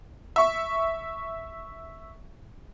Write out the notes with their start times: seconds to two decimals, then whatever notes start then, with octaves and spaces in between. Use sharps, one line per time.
0.36 E5 C#6